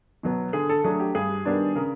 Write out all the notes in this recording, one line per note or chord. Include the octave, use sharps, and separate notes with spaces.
B2 F#3 B3
D3 G#4
A4
F#3 A3 D4 G#4
G4
G2 G#4
D#3 G3 B3 D4
C#3 A#4